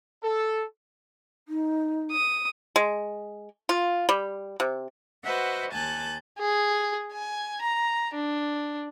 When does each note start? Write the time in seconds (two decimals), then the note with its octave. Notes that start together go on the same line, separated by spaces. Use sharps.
0.23 A4
1.48 D#4
2.10 D#6
2.76 G#3
3.69 F4
4.09 G3
4.60 C3
5.24 F#4 B4 C5 D#5 E5 F#5
5.73 D#2 G#5 A5 F#6 G6 A6
6.39 G#4
7.13 G#5
7.61 A#5
8.14 D4